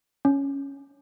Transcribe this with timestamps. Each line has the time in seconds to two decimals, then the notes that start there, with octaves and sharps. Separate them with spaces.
0.25 C#4